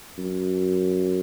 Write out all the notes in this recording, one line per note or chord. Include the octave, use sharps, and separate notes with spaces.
F#2